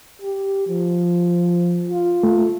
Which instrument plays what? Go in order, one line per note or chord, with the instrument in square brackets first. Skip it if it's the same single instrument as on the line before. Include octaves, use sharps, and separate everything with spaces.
[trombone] G4
F3
F4
[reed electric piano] A3